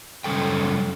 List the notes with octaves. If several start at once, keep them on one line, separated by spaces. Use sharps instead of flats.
F#2 C#3 G3 A4 G5